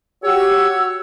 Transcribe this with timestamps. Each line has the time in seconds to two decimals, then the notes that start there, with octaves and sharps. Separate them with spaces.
0.24 F#4 G4 C#5 F#5 E6